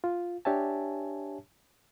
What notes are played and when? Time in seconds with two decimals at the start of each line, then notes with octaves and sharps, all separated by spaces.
0.04 F4
0.45 D4 G4 C#5 E5 G#5 A5